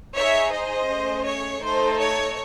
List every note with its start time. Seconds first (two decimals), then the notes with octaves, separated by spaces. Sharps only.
0.15 D#4 G#4 C#5 E5
0.52 C5 D#5
0.88 A3 C#4 G#4
1.24 C#5
1.61 A3 D#4 A4 C5
1.98 C#5